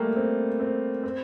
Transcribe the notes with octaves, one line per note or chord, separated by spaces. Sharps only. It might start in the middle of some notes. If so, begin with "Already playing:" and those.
Already playing: G3 A3 A#3
C4
C4
C4